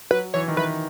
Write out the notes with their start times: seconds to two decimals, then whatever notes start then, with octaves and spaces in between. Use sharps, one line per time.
0.11 F#3 B4
0.34 E3 C#5
0.48 D#3
0.57 E3 B4